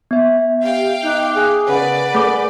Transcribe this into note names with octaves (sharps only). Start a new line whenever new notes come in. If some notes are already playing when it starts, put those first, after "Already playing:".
B3 E5
G4 F5 G5
D#4 D6 F#6
G#4
C#3 A#4 B4 D5 F#5
A3 G#4 A4 D6